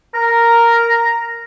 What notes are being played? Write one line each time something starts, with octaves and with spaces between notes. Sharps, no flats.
A#4 A#5